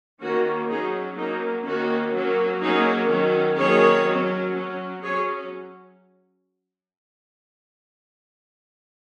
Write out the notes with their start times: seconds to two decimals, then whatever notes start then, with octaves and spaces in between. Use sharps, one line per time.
0.21 D#3 A#3 C#4 F#4
0.69 F#3 C#4 D#4 G#4
1.17 F#3 A#3 C#4 D#4
1.66 D#3 A#3 C#4 F#4
2.14 F#3 A#3 C#4
2.62 F#3 A#3 C#4 D#4 G#4
3.10 D#3 F#3 C#4
3.58 D#3 F#3 A#3 C#4 G#4 C#5
4.07 F#3 C#4
4.56 F#3 C#4
5.03 F#3 C#4 G#4 C#5